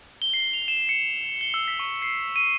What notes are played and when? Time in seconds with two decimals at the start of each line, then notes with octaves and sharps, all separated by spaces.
0.22 G7
0.34 C7
0.53 F7
0.68 E7
0.89 C#7
1.41 G7
1.54 E6
1.68 B6
1.80 C#6
2.02 C7
2.36 D#7